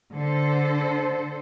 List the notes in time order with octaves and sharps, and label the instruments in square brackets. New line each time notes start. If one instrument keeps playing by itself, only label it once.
[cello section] D3 A4 C5